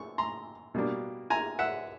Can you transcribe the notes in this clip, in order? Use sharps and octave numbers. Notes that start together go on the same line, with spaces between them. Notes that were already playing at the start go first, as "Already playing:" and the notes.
Already playing: C#6
A#5 C6
B2 G3 A#3 D4
G#5 A#5
E5 F#5